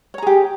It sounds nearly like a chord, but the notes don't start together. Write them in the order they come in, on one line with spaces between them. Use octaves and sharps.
C#5 A#5 G#4 G4